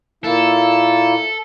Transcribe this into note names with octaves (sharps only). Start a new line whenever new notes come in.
A#2 A#3 E4 A4